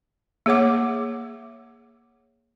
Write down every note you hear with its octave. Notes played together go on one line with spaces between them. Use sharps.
A#3 G#4 C#5 F#5 D6